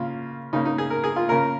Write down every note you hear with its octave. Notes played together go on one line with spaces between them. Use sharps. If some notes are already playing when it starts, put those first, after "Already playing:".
Already playing: C#3 A#3 F4
C#3 A#3 D#4
D#4
G#4
A#4
G#4
F4
C#3 A#3 A#4